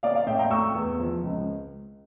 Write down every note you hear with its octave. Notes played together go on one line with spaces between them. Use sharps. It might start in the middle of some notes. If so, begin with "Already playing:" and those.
A#3 D5 F5
D5 F5
A2 E5 G5
G5 A#5
A3 C#6 E6
E2
F3
C#2